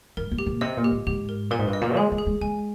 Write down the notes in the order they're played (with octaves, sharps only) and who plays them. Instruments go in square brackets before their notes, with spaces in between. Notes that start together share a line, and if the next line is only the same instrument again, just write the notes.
[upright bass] G2 [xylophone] A#4
[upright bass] G#2
[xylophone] G4
[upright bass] A#2
[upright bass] C3 [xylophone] D#5
[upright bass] A#2
[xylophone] G4
[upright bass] G#2
[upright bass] G#2 [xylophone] G4
[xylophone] A#4
[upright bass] A#2 [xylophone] A#4
[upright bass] G#2
G2
[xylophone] D#5
[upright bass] A#2
[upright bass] G#3 [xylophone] G#4
[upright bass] G#3
[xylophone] G#4
[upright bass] G#3
[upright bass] G#3 [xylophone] G#5